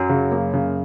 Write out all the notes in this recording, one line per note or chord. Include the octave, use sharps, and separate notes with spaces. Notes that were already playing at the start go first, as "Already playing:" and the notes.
Already playing: F#2 F#3
C#3
A#3
C#3